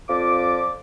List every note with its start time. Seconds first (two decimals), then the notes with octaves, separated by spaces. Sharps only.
0.09 F2 F3 D5 D6